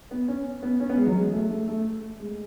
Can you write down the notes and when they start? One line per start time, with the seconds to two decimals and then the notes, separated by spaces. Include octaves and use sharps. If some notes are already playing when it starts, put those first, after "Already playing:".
0.11 B3
0.28 C#4
0.63 B3
0.80 C#4
0.89 B3
0.97 G#3
1.07 F#3
1.16 G#3
1.32 A3
1.49 A3
1.68 A3
2.19 G#3